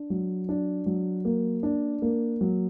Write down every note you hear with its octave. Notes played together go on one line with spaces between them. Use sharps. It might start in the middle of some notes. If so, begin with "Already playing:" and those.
Already playing: D4
F#3
D4
F#3
A#3
D4
A#3
F#3